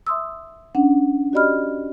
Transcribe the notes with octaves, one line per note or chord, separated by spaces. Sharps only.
E5 C6 D#6 E6
C#4 D4 F#5
F#4 G4 D5 D#5 B5 F6